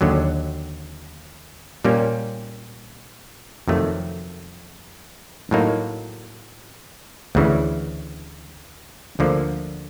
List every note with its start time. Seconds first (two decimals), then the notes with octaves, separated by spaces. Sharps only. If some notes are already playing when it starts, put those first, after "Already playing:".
0.01 D#2 D3 F#3
1.84 A#2 G3 A#3 C#4
3.68 F2 C3 D#3 F#3 A3
5.51 A2 F#3 A#3 D#4
7.35 D2 C#3 E3
9.19 D2 D3 F3 A#3